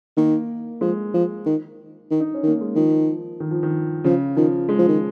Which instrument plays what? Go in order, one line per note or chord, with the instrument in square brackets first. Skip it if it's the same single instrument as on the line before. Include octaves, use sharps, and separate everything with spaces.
[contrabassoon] D#3 [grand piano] A#3
[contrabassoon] F3 [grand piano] G#3
[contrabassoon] F3
D#3
D#3
[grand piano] D#4
C#4
[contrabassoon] D#3 [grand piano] A#3
[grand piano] G#3
[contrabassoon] D#3 [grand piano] F3
[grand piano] D#3
F3
D#3
[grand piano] C#3 [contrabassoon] F3
[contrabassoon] D#3 [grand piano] F3
[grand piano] G#3
[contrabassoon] F3
D#3